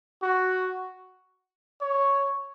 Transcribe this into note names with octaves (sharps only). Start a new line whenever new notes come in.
F#4
C#5